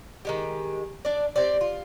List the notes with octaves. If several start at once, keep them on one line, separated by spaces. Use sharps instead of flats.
D#3 G#3 G4
D4 D5
C4 G4 D5
F4